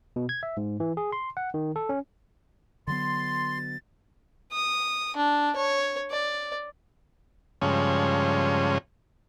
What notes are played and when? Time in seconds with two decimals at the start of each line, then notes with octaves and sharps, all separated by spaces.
0.16 B2
0.29 G#6
0.43 E5
0.57 G#2
0.80 E3
0.97 G#4
1.12 C6
1.37 F#5
1.54 D#3
1.76 A4
1.89 C#4
2.87 D3 F#3 B3 C6 A6
4.53 D#6
5.16 D4
5.56 C#5
6.11 D5
7.62 G2 C#3 F3 G#3 C#4